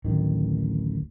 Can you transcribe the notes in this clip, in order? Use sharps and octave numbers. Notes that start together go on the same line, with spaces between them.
D1 A1 D#3